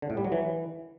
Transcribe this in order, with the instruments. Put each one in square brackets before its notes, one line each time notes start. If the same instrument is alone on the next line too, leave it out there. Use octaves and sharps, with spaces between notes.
[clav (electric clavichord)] D3
A2
G3
F#3
E3